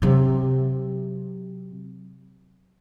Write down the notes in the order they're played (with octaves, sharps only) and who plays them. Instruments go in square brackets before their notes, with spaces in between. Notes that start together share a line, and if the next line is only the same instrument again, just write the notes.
[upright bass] C3 F#3